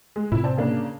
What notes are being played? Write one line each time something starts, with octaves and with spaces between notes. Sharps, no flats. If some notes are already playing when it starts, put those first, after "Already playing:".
G#3
A2 C3 E4
C4 D5 A5
C#3 A#3 D4